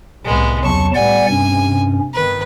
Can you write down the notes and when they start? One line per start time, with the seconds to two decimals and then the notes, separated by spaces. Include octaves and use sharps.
0.24 C2 A2 G#3 B3
0.64 E2 C#3 F#3 A5 C#6
0.94 A2 G3 B3 D5 F#5 G#5
1.29 G2 C3 C#4
2.14 G1 D#3 B4